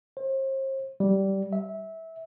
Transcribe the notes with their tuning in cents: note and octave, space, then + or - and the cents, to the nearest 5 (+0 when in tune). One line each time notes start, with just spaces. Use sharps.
C5 +40
G3 -15
E5 -20